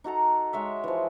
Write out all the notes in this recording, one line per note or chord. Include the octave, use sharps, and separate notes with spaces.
D#4 F#4 A4 A#5
G#3 C#5 E5
E3 F3